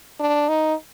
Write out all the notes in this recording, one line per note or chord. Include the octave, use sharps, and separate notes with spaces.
D4
D#4